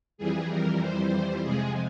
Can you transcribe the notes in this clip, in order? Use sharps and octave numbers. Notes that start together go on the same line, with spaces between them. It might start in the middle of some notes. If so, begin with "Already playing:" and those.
F2 E3 G3 G#4
A#4
C5
F2 C3 F3 G#3 G#4